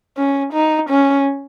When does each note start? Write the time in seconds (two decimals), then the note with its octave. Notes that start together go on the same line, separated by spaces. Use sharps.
0.17 C#4
0.54 D#4
0.90 C#4